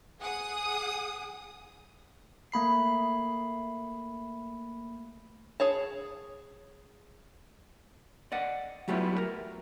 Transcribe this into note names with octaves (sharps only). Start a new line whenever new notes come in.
G#4 F#5 D#6
A3 A#3 B5 C7
G#4 C#5 A5
D5 D#5 F#5
F#3 G3 A3 B3 E4 F4
A#4